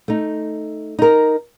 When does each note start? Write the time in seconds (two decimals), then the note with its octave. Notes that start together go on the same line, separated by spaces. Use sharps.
0.08 A3 D#4
0.99 D#4 A#4